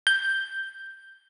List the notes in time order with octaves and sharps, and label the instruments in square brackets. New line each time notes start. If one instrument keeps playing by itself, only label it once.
[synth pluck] G6